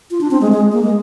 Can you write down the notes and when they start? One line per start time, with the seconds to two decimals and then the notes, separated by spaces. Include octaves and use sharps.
0.11 F4
0.21 D4
0.31 C4
0.41 G#3
0.52 G#3
0.72 A#3
0.83 G#3